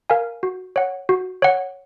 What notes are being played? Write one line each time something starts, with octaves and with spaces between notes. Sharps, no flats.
A#4 F5 G#5
F#4
C#5 F#5
F#4
C#5 F#5